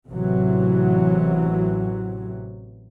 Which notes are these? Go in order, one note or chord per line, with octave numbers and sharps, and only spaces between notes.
A1 C3 E3 F#3